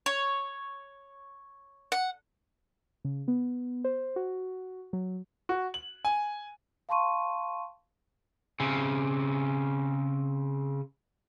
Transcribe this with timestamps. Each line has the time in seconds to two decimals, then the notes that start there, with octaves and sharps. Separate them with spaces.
0.06 C#5
1.92 F#5
3.05 C#3
3.28 B3
3.84 C5
4.16 F#4
4.93 F#3
5.49 F#4
5.74 F#7
6.05 G#5
6.89 F5 A5 C6 C#6 D#7
8.60 C#3 C4